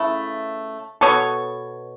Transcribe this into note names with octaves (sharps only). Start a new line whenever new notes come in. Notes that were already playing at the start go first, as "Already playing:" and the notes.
Already playing: C#3 A3 E4 B4
B2 B3 A4 C#5